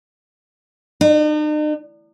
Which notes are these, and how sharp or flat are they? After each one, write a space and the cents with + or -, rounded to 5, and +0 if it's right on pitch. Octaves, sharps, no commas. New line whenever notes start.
D#4 -45